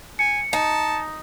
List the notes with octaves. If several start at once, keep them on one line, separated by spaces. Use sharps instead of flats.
G#5 C#7
D#4 A5